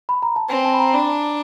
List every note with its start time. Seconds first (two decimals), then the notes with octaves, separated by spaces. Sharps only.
0.09 B5
0.23 A#5
0.36 A5
0.49 C4 G#5
0.65 A5
0.74 B5
0.80 A#5
0.94 D4 B5